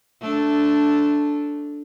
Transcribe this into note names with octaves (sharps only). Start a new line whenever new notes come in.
A3 D4